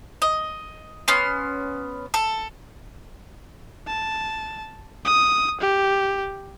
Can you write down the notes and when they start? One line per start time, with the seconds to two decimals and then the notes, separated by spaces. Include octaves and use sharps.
0.22 D#5
1.08 B3 C#4 C6
2.14 A4
3.87 A5
5.05 D#6
5.61 G4